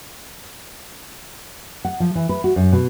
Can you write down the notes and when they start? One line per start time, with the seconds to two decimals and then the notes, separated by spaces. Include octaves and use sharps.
1.85 F#5
2.00 F3
2.15 E3
2.29 B4
2.44 F#4
2.56 F#2
2.72 B2